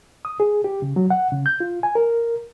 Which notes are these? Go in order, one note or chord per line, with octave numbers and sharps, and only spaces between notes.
D#6
G#4
G4
C#3
F#3
F#5
C#3
G6
F4
G#5
A#4